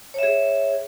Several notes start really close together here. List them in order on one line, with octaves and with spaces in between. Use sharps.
C#5 E5 G#4